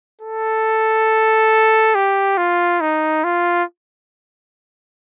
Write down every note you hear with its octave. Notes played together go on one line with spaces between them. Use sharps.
A4
G4
F4
D#4
F4